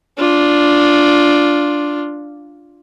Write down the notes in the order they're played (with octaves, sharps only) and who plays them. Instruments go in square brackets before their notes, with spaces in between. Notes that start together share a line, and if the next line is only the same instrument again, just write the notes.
[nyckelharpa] D4 F4